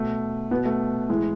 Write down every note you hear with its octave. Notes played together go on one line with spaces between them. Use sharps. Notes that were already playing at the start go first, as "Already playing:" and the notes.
Already playing: B2 A3
B2 B3
A3
A2 E3 G#3